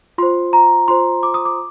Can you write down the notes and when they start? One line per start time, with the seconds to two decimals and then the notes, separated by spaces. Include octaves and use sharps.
0.18 F4 C5 C6
0.53 A#5
0.88 F4 C5 C6
1.23 D6
1.34 D#6
1.45 D6